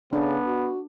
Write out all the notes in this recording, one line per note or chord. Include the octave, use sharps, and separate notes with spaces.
C#3 B3 D4
F#4